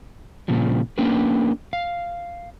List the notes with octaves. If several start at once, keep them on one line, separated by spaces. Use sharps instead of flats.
A#2 C#3 F3 G3
A#3 C#4 D4 G4 A#4 B4
F5